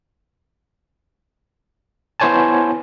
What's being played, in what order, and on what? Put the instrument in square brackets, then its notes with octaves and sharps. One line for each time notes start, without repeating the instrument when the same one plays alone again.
[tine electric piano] B3 E4 C5 C#5 G#5 A5